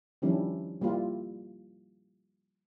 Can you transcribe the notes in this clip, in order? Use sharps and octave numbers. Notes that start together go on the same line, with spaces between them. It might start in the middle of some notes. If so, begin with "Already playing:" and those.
D#3 F3 G3 C#4 D4 E4
G3 A#3 E4 F4